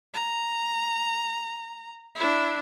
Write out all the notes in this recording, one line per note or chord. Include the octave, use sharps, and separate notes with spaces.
A#5
D4 E4